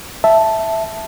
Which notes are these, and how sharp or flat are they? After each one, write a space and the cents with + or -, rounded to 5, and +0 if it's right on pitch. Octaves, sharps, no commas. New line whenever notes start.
E5 +0 A5 +0